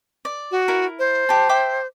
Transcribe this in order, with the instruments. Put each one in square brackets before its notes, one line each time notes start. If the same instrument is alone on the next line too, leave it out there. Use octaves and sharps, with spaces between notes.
[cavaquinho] D5
[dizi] F#4
[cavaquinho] E4 A#4
[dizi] C5
[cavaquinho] G4 A5
E5 G5 D6